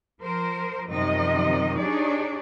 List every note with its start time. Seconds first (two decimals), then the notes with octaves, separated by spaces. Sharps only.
0.22 F3 A#4 C5
0.90 F#2 C3 D#3 F3 G3 D#5
1.78 D4 D#4 G4 G#4 C#5 D5